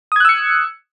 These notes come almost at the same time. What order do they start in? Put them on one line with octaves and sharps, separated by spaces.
D#6 G#6 F#6 E6 C#7